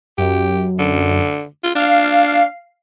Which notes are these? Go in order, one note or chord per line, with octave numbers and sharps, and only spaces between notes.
F#2 G4
D3
F4
D4 F5 C7